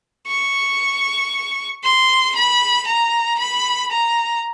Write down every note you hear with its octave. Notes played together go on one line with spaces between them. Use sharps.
C#6
C6
B5
A#5
B5
A#5